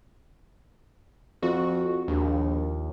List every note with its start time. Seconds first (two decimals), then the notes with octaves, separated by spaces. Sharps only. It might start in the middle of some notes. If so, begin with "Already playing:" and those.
1.43 F2 F#4
2.08 A#1 D#2